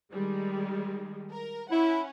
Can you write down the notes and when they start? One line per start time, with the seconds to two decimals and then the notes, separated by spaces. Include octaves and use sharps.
0.12 D#3 G3 G#3
1.31 A#4
1.71 C#4 E4 F#5